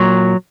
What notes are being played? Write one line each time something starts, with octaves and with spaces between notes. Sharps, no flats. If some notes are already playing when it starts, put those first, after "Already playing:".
Already playing: A#2 F#3